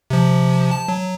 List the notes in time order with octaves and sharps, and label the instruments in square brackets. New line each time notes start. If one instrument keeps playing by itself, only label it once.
[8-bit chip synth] C3 F3
A5
F#3